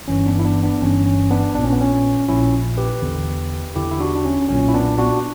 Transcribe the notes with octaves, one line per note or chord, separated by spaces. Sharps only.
G1 G2 E3 C#4
B3 D4
E4
B3 D4
B3 D4
G1 G2 E3 C#4
C#4
B3 D4
A#1 A#2 D4
C#4
B3
C#4
A#1 A#2 C#4 E4
G4 B4
E2 D3
E2 D3 E4 G4
E4
D4 F#4
D4
C#4
B1 A#2 C#4
E4
B3 D4
D4 F#4